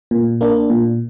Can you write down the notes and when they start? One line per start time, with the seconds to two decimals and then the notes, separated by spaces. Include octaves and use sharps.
0.11 A#2
0.41 A#3 D4
0.70 A#2